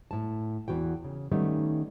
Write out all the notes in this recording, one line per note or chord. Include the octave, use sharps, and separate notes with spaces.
A2 A5
E2 E3 F#4 G5
C#3
D#3 G3 A3 B3 C#4 D#4